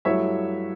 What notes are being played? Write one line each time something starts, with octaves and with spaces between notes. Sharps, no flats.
G2 F#3 A3 E4 C#5 E5